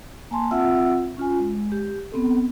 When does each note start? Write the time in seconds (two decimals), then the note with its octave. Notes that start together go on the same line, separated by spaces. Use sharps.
0.31 A#3 G#5 A5 C6
0.51 C4 F4 E5 F#5 E6
1.17 C#4 F4 G#5
1.40 G#3
1.72 G4
2.12 B3 C4 A4